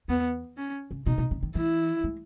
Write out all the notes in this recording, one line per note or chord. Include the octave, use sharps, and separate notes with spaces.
E2 B3
C#4
C#3
B2 D#4
B2
C#3
D#3
E3 E4
G#3